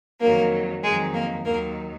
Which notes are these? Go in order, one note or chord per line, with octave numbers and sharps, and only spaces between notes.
F2 D#3 F#3 A#3 A#4
F2 D#3 F#3 G#3 G#4
A#3 A#4
D#2 D#3 F#3 A#3 A#4